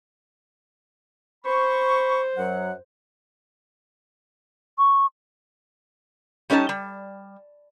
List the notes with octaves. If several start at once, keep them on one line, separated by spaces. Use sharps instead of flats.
C5 B5 C#6
F#2 F#3 F#5
C#6
G3 C#4 D#4 B4 A5
G3